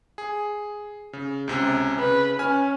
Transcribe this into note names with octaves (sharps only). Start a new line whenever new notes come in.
G#4
C#3
C#2 C3 C#4
C#3 B4
C#4 G#5 F6